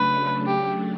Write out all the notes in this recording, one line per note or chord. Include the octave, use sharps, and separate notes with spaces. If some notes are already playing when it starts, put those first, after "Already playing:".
Already playing: C#3 F#3 A3 D4 B4
G4